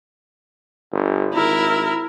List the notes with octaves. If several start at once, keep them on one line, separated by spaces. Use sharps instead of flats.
G1
G#1 E4 A#4